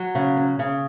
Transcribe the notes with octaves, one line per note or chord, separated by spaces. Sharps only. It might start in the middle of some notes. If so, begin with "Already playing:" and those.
Already playing: F#3
C#3
C#4
C#3